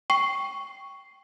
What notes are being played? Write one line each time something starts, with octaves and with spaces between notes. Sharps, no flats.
G5 C#6 C7